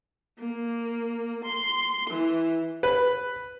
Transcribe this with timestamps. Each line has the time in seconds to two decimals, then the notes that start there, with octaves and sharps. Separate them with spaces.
0.38 A#3
1.44 C6
2.09 E3
2.83 B4